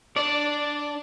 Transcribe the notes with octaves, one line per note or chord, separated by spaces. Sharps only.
D4 D5